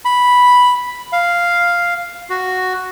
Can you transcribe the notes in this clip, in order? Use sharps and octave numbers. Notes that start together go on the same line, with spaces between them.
B5
F5
F#4